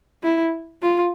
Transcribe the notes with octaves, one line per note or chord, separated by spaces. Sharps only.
E4
F4